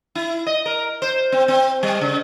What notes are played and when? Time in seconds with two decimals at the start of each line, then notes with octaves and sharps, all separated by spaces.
0.15 E4
0.47 D#5
0.66 A#4
1.02 C5
1.32 C4
1.48 C4
1.83 G3
2.01 C#3